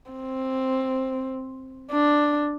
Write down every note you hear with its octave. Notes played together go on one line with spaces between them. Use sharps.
C4
D4